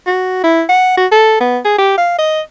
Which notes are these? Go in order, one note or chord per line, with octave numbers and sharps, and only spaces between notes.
F#4
E4
F#5
F#4
A4
B3
G#4
G4
F5
D#5